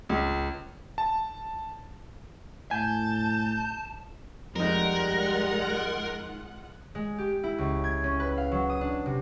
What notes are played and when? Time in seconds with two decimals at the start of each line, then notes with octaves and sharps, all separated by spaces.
0.09 C#2
0.98 A5
2.71 A2 G#5 A5 G6
4.56 F2 G3 G#3 D#4 F4 A#4 F#5
6.95 G#3
7.18 G4
7.44 E4
7.58 C#2
7.84 G#6
8.04 C#4
8.20 B4
8.38 F5
8.52 F#3
8.70 D#6
8.81 D4
9.06 C3